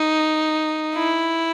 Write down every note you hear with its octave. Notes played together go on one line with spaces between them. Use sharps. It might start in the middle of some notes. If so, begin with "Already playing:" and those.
Already playing: D#4
E4